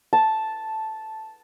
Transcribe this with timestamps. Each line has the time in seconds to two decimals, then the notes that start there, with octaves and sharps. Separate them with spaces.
0.13 A5